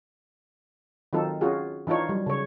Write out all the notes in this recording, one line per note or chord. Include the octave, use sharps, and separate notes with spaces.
D#3 F#3 C4 D#4 F4 A4
C#4 F4 F#4 G#4
E3 D4 D#4 F4 C#5
F#3 G3
C#3 C#5